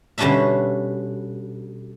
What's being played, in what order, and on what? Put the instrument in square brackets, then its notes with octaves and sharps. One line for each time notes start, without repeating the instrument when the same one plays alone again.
[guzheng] B2 D3 G3 C#4 D4 E5